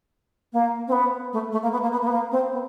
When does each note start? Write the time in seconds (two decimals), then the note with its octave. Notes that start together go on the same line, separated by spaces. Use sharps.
0.53 A#3
0.87 C4
0.92 B3
1.33 A3
1.52 A3
1.62 A#3
1.72 B3
1.82 A#3
1.92 B3
2.01 A#3
2.07 B3
2.12 A#3
2.31 C4
2.51 B3